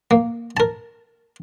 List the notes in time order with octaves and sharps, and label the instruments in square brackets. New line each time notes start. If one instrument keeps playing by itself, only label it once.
[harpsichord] A#3
A#4 A5